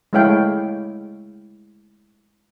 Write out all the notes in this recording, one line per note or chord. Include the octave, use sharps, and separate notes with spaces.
G#3 A3 E4 C#5 F5 G5